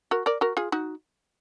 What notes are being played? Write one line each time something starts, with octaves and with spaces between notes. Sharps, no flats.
F#4 A#4
A#4 D5
F#4 A#4
F4 G#4
D#4 F#4